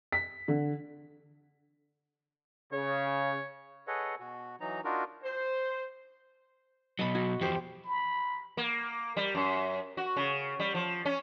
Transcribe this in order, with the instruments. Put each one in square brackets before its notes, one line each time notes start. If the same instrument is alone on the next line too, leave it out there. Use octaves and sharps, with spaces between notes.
[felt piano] B6
D3
[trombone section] C#3 [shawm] C#5
[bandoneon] G#4 A4 B4 C#5 D#5 F#5
B2 F#4
E3 F#3 D#4 A#5
D4 D#4 F4 F#4 A#4
[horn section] C5
[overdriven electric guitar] B2 F#3 [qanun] D#5 A5 B5
[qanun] F#4
[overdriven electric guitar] E2 F3 [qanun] G4 C5
[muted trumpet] B5
[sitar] A#3
G3
F#2
F#4
C#3
G3
F3
C#4